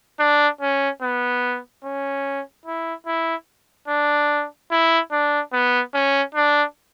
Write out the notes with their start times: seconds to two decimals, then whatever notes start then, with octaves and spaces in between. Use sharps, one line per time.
0.19 D4
0.61 C#4
1.02 B3
1.84 C#4
2.65 E4
3.06 E4
3.88 D4
4.71 E4
5.12 D4
5.53 B3
5.93 C#4
6.34 D4